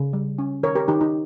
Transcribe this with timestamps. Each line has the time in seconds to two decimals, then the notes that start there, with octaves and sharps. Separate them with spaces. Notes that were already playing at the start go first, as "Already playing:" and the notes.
Already playing: C#3
0.13 G3
0.38 C#4
0.63 D#3 A#4 C#5
0.75 G4 A#4
0.88 D#3 D#4 G4
1.01 D#4 G4